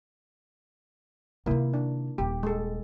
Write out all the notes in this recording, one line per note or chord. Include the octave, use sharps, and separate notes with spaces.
C3 D#3 A#3 E4
D4
D#1 G4
G#3 A4